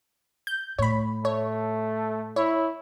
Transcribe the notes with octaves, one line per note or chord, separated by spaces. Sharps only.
G6
A2 C#5 B5
A3 C#5
E4 C#5